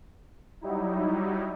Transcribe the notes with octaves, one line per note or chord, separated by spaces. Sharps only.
F#3 G3 D#4 E4